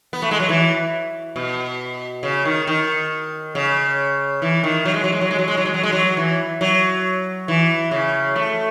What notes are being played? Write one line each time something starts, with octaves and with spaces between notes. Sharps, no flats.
B3
A3
G#3
F#3
E3
B2
C#3
D#3
D#3
C#3
E3
D#3
F#3
G#3
F#3
G#3
F#3
G#3
F#3
G#3
F#3
G#3
F#3
G#3
F#3
E3
F#3
E3
C#3
A3